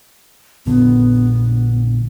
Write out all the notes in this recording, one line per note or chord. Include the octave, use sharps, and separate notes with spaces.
A#1 A#2 D3 B3